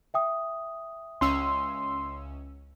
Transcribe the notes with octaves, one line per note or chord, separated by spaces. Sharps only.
E5 G5 D#6
C#2 C#4 C6 E6